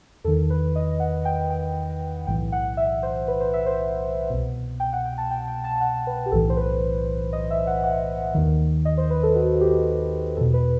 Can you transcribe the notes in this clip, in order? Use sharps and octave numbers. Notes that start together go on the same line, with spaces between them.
E2 D#3 A4
B4
D#5
F#5
G5
G5
B1 A2 E3 G5
F#5
E5
C5
B4
C5
E5
C5
C2 B2
G5
F#5
G5
A5
G5
G5
A5
F#5
B4
G4
B1 A2 E3 A4
C5
B4
D#5
E5
F#5
F#5
D#2 D#3
D#5
C5
B4
A4
F#4
G4
E2 B2 A4
B4